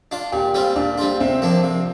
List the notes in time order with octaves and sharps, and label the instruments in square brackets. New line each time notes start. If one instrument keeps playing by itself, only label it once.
[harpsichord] D4 F4
[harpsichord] A#2 [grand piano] G4
[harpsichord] G3 C4 F4
[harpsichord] A#2 [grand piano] D4
[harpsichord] G3 C4 F4
[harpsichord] C3 [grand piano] C4
[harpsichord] F3 A#3 D4
C3